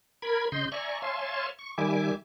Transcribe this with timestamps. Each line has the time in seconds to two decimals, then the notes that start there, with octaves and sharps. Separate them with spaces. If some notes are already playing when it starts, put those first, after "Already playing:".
0.22 A#4 B5 G#6
0.52 C#3 D#5 C6 G6
0.72 D5 E5 G#5 A#5 C#6
1.02 C#5 E5 F5 G#5 A5 C6
1.59 C#6
1.78 D#3 G3 E5 G#5 D6